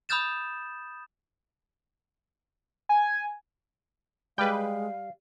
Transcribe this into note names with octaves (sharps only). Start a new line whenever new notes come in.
B5 D#6 F6 G6 A6 E7
G#5
G3 G#3 B4 F5 G5